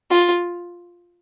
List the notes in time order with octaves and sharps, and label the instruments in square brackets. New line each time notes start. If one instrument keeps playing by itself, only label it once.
[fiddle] F4